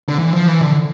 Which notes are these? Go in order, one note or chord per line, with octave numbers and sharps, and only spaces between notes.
D3
E3
F3
E3
D3